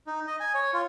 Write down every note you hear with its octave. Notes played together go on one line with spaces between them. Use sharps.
D#4
D#5
G#5
C#5
F4